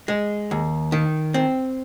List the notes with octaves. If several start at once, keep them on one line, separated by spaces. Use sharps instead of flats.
G#3
D#2
D#3
C4